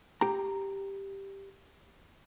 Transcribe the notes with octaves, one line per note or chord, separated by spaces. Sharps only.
G4 A#5